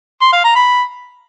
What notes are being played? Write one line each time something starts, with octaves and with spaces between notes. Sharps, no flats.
C6
F5
A#5
B5